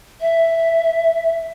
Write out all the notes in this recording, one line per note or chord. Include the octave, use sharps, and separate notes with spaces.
E5